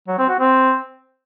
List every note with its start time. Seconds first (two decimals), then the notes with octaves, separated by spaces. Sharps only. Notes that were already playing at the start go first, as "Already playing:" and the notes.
0.08 F#3
0.18 C4
0.29 F#4
0.39 C4